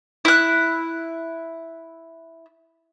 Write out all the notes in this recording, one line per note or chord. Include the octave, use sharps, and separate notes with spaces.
E4 F#6